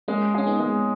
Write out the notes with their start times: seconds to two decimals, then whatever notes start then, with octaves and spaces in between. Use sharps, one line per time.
0.08 G#3 A#3 C#4
0.34 C#4 G#4
0.47 B3 D#4
0.60 G#3